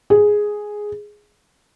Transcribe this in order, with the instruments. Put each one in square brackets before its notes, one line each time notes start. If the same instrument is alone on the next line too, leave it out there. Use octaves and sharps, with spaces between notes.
[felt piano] G#4